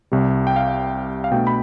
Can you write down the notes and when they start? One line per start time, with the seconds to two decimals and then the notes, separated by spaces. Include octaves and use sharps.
0.12 C2 C3 G3
0.47 G5
0.56 F5
1.24 F5
1.31 B2 A3 D4 G5
1.47 B5